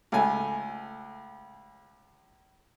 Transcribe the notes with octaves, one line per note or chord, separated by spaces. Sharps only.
C#2 A3 G#5